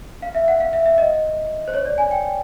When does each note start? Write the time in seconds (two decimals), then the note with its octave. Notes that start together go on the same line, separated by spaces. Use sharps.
0.22 F5
0.35 E5
0.48 F#5
0.60 F5
0.73 E5
0.86 E5
0.98 D#5
1.68 C5
1.74 C#5
1.85 D5
1.98 G#5
2.11 G5